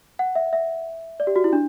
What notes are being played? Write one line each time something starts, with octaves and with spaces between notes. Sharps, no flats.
F#5
E5
E5
D5
G4
F#4
E4
D4